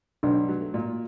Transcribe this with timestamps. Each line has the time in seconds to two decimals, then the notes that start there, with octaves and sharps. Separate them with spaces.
0.23 B1 D4
0.49 F#3
0.61 A3
0.74 A#2